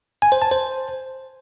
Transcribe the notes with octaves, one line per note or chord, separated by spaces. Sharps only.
G#5
C5
A5
C5